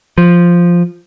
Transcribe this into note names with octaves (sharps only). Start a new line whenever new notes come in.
F3